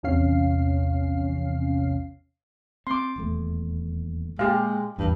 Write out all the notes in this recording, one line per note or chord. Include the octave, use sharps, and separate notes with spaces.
A#1 E2 C3 C#4 F5 C7
C4 C6 D6
D#1 E2 A3
A#2 G#3 G4 F5
A1 E2 G2 E3